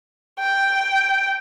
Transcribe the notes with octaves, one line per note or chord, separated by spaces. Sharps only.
G5